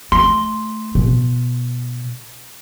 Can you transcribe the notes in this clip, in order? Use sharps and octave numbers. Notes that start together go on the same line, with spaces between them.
A3 C6
B2